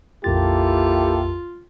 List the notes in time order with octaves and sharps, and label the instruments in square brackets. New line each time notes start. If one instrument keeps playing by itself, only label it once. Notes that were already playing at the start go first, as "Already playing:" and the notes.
[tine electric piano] A#1 F2 A6 [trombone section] A#3 E4 A4 [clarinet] F4 [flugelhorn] G4